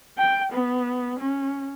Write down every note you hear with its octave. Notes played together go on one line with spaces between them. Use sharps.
G5
B3
C#4